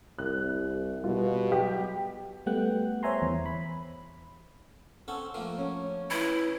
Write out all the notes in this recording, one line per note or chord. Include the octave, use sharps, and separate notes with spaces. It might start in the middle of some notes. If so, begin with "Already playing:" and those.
C2 F#6
B2 G3 F4
F#3 G4
G3 A3 B3 F#5 G5 F#6
C5 C#5 E5 G#5 A#5 C6
E2
B5
C4 C#4 A4 F#5
F3 A3 A#3
C#4
E3 E4